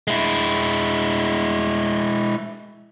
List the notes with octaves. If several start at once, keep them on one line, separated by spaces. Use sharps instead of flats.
G#3 E4